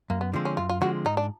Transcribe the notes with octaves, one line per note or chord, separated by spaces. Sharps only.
F#2 A#3
B3
D3 F3 G#3 C4
C#4
F#2 F4
F4
D3 F3 G#3 C4 F#4
G#2 D#4
D4